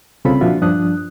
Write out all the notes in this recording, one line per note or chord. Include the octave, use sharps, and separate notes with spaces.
C2 C#3 C4 F4 A4 B5
A#2 F3 D4 F4 F#4 E5
G2 F3 D4 D#6 F#6